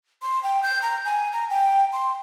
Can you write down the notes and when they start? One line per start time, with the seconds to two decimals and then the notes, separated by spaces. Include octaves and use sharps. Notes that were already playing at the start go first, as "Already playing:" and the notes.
0.22 C6
0.43 G5
0.63 G6
0.82 A#5
1.05 G#5
1.33 A#5
1.50 G5
1.92 C6